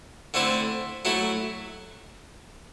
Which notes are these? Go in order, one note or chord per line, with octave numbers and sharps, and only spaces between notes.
D3 A3 C4 E4
F#3 A3 E4